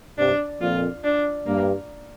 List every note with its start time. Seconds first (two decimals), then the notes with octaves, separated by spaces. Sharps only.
0.18 G2 C3 D4
0.61 F2 A#2 F4
1.04 D4
1.47 G2 A#3